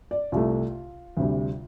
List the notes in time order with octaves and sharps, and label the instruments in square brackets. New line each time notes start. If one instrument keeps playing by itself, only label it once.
[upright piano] D5
C2 C3 A3 F4
D2 C3 G3